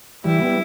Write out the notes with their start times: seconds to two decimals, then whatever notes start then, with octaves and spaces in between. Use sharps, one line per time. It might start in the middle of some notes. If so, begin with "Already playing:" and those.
0.24 E3 G3 E4
0.41 G3 B3